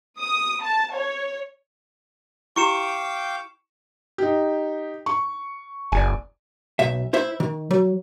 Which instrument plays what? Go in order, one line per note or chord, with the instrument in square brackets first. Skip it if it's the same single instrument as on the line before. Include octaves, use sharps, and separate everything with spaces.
[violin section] D#6
A5
C#5
[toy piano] E4 G4 [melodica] F5 G5 D6 [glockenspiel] C#6 C#7 E7
[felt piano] D#4 G4
C#6
[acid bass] F#1 [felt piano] D5 G#5
[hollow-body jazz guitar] B1 E5
E4 C5 E5
D#3
F#3